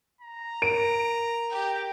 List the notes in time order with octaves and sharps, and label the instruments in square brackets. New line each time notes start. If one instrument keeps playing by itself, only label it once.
[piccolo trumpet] A#5
[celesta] A#4 [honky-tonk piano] D7
[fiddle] G4 G5